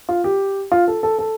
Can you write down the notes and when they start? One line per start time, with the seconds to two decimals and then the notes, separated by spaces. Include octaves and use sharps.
0.09 F4
0.24 G4
0.72 F4
0.88 A4
1.03 A4
1.19 A4